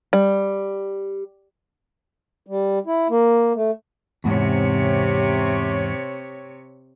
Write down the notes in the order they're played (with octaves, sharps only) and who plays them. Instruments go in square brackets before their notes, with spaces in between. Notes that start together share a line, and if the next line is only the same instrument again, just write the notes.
[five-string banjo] G3
[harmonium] G3
E4
A#3
A3
[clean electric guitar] E2 G#2 [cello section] C3 C#5